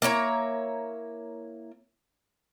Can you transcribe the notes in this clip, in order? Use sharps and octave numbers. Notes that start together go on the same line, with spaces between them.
A#3 E4 C#5 A#5